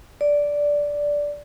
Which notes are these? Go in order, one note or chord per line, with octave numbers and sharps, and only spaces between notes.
D5